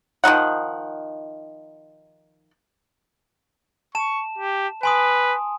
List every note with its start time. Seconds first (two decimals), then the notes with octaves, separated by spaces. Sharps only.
0.24 D#3 F3 D#4 F#5
3.95 A5 C#6 E7
4.38 G4
4.83 B4 G#5 C6 D#6